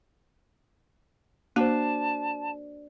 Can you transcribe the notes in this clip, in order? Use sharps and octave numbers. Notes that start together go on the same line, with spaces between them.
A#3 D4 F#4 C5 A5